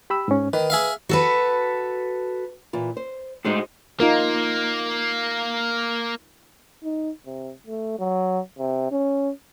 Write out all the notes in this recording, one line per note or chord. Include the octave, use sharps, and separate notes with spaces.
G4 B5 E6
G#2 C#4
D#3 B4
G#4 E5 F5
F#4 A4 B4
A#2 E3 F4
C5
A2 G#3 D#4 F#4 C5 D#5
A#3 D#4 F4 A#4
D#4
C3
A3
F#3
C3
C#4